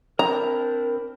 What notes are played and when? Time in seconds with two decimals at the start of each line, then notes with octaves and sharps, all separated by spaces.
0.19 C4 D4 E4 A#4 A#5